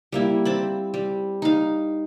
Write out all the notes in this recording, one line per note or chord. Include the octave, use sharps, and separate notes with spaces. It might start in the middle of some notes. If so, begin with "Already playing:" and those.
G3 A#3 E4
C4 A5 B5
G3
D#4 F5